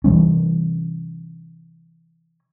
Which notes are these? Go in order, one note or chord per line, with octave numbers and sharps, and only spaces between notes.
C3 E3 G3 C#4